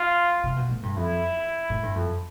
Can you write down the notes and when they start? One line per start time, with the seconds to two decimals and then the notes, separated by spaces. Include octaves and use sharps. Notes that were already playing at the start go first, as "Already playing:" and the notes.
Already playing: F4
0.44 C3
0.56 B2
0.69 A2
0.83 G2
0.96 F2 E4
1.70 A2
1.83 G2
1.96 F2